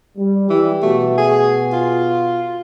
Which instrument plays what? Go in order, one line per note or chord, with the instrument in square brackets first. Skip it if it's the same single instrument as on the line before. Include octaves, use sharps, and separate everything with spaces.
[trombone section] G3
[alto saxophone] E3 [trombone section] G3 G4
[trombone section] B2 F#4 [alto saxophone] A3
[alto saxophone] G#4
F4